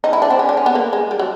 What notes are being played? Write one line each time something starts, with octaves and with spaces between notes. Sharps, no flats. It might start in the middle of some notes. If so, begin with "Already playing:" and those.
D#4
E4
D4
C4
C#4
D4
C#4
B3
A#3
G#3
G3
F#3